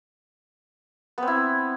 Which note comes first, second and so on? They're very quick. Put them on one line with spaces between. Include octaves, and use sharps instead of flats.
B3 C4 E4